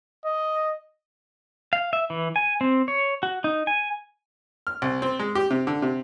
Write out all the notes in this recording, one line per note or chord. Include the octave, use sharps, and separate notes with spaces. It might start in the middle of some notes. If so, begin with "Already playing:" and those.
D#5
F5
E5
E3
G#5
C4
C#5
F#4
D#4
G#5
F6
C2
C4
G#3
G4
C3
D3
C3